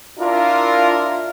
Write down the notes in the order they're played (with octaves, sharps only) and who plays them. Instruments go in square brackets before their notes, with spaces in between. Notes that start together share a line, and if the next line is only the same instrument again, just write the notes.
[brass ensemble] D4 E4 F4 A#4